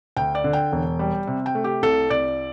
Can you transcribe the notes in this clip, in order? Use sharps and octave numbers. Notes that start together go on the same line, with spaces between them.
D2 G5
D5
D3
G5
E1
G3
C3
G5
A3
G4
C2 A4
C2 D5